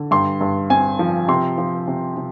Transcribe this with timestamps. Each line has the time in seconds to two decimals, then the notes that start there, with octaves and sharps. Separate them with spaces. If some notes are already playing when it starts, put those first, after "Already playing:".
Already playing: D3
0.11 G2 C6
0.41 G2
0.70 C4 G#5
0.99 F3
1.28 C3 C6
1.58 F3
1.87 C3
2.17 C3